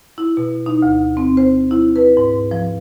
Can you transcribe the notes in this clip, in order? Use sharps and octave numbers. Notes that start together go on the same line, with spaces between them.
E4
B2
D#4
D2
C4
C5
E4
B4
G#2
F3